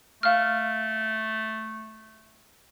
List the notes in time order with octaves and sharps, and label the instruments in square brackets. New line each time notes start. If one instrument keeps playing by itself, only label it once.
[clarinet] A3 [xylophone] F5 F6